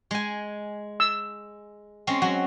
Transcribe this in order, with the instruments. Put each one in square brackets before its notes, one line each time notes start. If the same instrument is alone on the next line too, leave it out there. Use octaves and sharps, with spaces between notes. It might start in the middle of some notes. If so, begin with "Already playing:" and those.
[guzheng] G#3 G#5
[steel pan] E6
[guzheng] G#3 C4 C#4
F#3 F#4